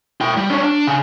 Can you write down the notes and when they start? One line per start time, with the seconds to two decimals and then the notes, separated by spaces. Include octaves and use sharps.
0.21 E4 G5
0.37 G3
0.50 C#4 D4
0.63 D4
0.87 C#3